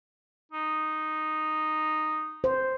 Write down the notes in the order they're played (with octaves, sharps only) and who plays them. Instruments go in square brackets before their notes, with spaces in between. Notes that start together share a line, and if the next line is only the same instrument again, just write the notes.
[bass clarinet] D#4
[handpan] C5